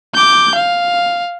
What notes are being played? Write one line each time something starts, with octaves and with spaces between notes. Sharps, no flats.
D6 G6
F5